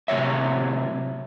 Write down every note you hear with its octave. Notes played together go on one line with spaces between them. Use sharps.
A2 C3 F#3 C#5 E5